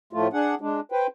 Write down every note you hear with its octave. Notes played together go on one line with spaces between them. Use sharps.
A2 F3 A3 F4
D4 G#4 F#5
G#3 D4
B4 C5 G5